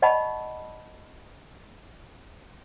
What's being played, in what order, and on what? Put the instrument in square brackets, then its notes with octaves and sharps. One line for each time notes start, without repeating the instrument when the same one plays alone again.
[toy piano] D5 D#5 F#5 A5 B5 C#6